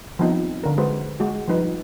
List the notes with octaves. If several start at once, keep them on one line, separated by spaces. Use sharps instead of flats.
F3 G3 B3 C4 D#4
D3 A#4
G#3 F#4 B4 C5
G#3 F#4
F3 G3 D#4 B4